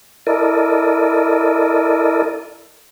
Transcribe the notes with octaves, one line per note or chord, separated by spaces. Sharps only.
E4 A4 A#4 D5 D#5